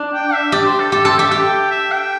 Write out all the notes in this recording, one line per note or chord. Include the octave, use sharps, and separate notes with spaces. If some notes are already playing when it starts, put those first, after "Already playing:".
Already playing: D4
G5
E5
G4 D5
C5
A4
G4 A4
A4 C5
G4 E5
G4 G5
E5
G5